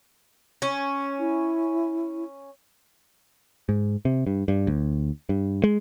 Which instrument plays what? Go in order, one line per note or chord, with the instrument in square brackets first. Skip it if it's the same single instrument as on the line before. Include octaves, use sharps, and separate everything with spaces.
[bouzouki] C#4
[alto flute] E4
[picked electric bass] G#2
C3
G2
G2
D2
G2
G#3